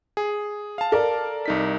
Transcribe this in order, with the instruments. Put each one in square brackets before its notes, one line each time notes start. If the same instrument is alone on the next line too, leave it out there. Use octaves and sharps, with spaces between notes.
[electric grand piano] G#4
F5 A5
[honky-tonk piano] A4 A#4 D5
[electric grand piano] C2 D#4 B6